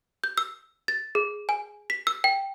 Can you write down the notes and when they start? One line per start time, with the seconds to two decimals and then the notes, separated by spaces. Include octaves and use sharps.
0.24 G6
0.38 E6
0.88 A6
1.15 G#4
1.49 G#5
1.90 B6
2.07 E6
2.24 G5